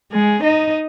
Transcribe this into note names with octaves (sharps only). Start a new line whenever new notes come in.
G#3 G#4
D#4 D#5